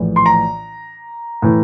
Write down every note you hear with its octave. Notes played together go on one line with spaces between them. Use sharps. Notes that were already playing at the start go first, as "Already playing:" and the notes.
Already playing: A#1 A2 E3
C6
A#5
A2 E3